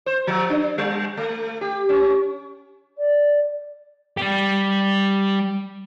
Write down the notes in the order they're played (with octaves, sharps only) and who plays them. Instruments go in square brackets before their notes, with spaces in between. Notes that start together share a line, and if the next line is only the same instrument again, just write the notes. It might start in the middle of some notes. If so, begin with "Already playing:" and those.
[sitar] C5
F3
D4
G3
A3
G4
C#4
[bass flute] D5
[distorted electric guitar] G3 G4